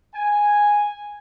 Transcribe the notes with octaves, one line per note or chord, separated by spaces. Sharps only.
G#5